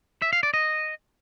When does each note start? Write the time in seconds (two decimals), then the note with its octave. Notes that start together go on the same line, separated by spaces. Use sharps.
0.22 E5
0.33 F5
0.43 D5
0.54 D#5